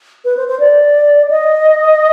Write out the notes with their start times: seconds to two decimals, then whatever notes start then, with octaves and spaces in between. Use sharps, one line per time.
0.24 B4
0.37 C5
0.48 C5
0.59 D5
1.30 D#5